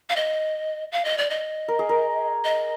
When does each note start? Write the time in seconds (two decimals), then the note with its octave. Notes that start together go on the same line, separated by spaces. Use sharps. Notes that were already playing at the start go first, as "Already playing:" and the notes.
0.10 F5
0.16 D#5
0.92 F5
1.05 D#5
1.18 D5
1.30 D#5
1.68 A#4
1.79 G#4
1.89 A#4
2.44 D#5